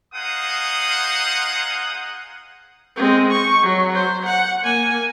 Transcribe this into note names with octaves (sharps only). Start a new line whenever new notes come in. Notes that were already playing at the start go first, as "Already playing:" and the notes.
D#4 G#4 C5 F5 F#5 D#6
G#3 C4
C#6
F#3
C5
F#5
A#3 G#5